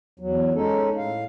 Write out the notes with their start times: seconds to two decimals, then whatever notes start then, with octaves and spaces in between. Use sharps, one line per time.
0.19 E2 F#3
0.54 G#3 C#4 D#4 A4
0.97 A2 F5